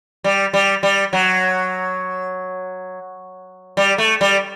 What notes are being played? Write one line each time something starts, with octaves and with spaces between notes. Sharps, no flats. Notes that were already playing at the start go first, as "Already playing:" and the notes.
G3
G3
G3
F#3
G3
A3
G3